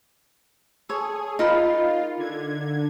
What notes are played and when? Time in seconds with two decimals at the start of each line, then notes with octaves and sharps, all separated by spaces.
0.89 G#4 A4 C#5
1.39 D#4 F4 A#4 B5
2.17 D3 G#6